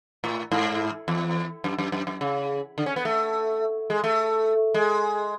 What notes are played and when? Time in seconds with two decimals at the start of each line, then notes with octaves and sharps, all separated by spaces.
0.24 A2
0.52 G#2
1.08 E2
1.64 F#2
1.79 F#2
1.92 F#2
2.07 F#2
2.21 C#3
2.78 D3
2.86 C#4
2.96 B3
3.05 A3
3.90 G#3
4.04 A3
4.74 G#3